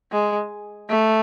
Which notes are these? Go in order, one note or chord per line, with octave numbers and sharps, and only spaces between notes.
G#3
A3